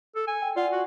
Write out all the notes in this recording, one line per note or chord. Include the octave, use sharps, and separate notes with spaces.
A4
G#5
G5
F4 D5 F#5
F#4